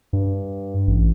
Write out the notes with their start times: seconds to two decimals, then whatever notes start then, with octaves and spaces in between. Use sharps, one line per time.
0.13 G2
0.87 A1